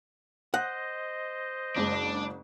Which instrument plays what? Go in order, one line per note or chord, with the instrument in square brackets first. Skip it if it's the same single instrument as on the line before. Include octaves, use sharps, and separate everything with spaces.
[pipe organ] C5 D#5 [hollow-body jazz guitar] F#5
[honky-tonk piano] F#1 G#3 [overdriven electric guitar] D4